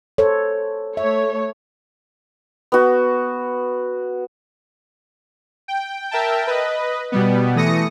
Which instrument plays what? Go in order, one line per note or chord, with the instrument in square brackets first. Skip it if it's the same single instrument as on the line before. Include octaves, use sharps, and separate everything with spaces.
[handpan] A4 C5 C#5
[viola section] A3 C#5 [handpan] E5
[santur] B3 F#4
[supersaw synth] G5
A#4 E5 G5 A5
B4 D#5
B2 G3 B3
E3 A3 D#6 A#6 C#7